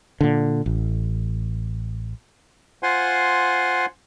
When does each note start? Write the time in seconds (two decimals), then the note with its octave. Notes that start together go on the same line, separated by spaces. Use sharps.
0.21 A#2 D3
0.66 A1
2.83 F4 C5 F#5 G#5 C6